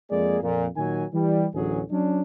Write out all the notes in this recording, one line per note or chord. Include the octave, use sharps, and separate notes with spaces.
F2 G#3 A#3 G#4 D5
F2 A#2
A#2 D#3 F#3 G#5
E3 G3
A1 D2 F#3 G#4
F#3 C#4 D4